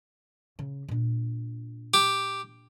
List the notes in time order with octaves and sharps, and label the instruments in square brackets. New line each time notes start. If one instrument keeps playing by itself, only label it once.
[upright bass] C#3
A#2 D4
[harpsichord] G4